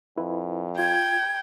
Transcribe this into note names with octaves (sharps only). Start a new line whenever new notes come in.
F2 E4 B4
F4 G5 G#6